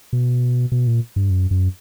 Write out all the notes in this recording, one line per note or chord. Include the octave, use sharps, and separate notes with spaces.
B2
B2
A#2
G2
F#2
F#2